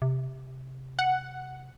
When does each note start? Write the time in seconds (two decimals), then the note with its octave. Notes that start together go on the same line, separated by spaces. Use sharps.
0.02 C3
0.99 F#5